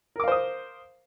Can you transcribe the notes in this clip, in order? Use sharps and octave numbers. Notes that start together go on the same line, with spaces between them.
A#4 C5 F5 D6 D#6